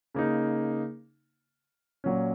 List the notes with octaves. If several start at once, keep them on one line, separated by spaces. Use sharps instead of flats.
C#3 A#3 D#4
A#2 F#3 C#4